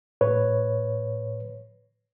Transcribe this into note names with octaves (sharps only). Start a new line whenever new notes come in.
A2 B4 C#5